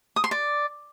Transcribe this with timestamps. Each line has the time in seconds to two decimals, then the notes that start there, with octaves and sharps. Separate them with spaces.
0.16 D#6
0.24 C6
0.31 D5